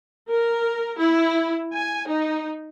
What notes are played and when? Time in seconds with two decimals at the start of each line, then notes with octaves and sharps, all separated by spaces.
0.30 A#4
1.00 E4
1.75 G#5
2.08 D#4